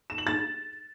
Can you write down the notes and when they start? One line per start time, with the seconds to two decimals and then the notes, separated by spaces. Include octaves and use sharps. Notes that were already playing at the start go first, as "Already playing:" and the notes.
0.10 E7
0.18 F#7
0.27 A6